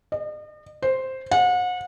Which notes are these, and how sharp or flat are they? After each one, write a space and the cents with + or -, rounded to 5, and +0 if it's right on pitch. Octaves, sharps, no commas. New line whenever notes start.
D#5 -45
C5 +0
F#5 -35